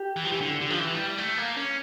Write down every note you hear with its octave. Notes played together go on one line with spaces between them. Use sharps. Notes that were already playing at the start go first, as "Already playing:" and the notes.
Already playing: G4
E3
F3
E3
D3
D3
F3
E3
A3
G3
A3
A#3
C#4